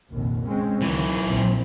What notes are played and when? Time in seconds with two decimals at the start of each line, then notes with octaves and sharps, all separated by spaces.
0.10 F1 A#1 D#2
0.47 G#3 C4 C#4
0.82 C#2 D#3 E3 F#3
1.23 A#1 C4